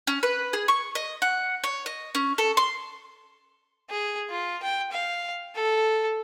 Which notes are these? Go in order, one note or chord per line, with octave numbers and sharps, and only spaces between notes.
C#4
B4
G#4
C#6
D#5
F#5
C#5
D#5
C#4
A4
C6
G#4
F4
G5
F5
A4